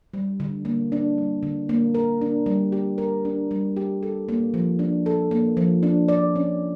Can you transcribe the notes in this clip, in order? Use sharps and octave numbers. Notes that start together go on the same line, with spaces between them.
G3
D3
A#3
D4
G3
D3
A#3
A#4
D4
G3
G4
A#4
D4
G3
G4
A4
A#3
F3
D4
A4
A#3
F3
D4
D5
C#4